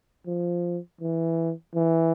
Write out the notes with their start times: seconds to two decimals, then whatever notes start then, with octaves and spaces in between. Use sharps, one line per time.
0.27 F3
1.01 E3
1.75 E3